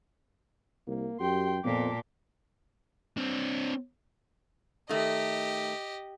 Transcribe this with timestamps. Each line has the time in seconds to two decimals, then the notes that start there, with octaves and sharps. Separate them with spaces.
0.87 C2 A#3
1.20 F#2 G4 G5 C6
1.65 F2 A#2 B3 A5 D6
3.17 C4 D4
4.89 D#3 A3 G4 D#5